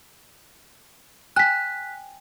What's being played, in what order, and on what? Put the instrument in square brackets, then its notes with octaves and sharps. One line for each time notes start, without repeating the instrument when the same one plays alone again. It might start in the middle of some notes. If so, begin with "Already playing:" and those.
[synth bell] G5 G#5 [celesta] F#6 B6